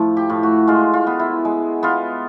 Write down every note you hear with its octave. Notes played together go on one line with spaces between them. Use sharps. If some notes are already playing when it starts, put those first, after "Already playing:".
Already playing: A2 F3
G4
A2
F#4
G#3 F4
F4
B3
E4
G#3
B3 F4